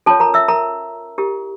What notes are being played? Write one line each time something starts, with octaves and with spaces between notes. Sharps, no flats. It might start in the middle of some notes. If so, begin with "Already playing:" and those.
C#4 F4 A4 C#5 A5
A#4 A#5
E5 E6
A#4 A#5
E4 G4 A#4